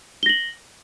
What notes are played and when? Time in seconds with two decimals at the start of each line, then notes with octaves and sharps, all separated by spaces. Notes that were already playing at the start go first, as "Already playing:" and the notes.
0.23 G7
0.26 A#6
0.29 F#7